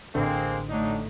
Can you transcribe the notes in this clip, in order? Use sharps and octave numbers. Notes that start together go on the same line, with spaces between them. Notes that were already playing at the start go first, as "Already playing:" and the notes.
A1 D3 G#3 A#3 C4
A2 F#3 D4 D#4